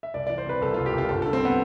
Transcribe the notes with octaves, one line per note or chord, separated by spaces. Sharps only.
E5
C2 D5
E3 D5
C5
C3 B4
C2 A4
F4
C2
G4
C2 F4
G1 A4
A4
G2
C4
B3